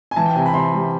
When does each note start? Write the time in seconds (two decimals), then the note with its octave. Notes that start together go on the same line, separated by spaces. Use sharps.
0.11 G#5
0.16 E3 A5
0.26 G5
0.35 C3 G#5
0.46 B5
0.54 C3 C6
0.73 G3